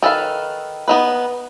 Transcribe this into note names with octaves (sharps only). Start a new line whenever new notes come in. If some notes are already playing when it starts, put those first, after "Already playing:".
D#3 A4 B4 F5
B3 D#4 B4